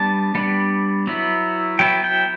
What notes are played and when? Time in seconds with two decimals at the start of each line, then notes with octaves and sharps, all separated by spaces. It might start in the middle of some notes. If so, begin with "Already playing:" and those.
Already playing: G3 B3 D4 A5
0.35 G3 B3 D4
1.07 F#3 B3 E4
1.79 F#3 B3 E4 G5
2.04 G5